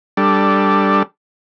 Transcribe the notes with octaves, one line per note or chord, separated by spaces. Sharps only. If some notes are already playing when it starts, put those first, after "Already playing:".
G3 D4 A4